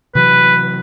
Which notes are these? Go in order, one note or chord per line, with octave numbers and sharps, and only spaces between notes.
C3 E3 F#3 B4